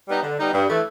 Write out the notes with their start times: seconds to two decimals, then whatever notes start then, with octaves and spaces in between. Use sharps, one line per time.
0.08 G3 B3 D#4
0.23 D3
0.38 G3 B3 D#4
0.53 G2
0.68 E3 A3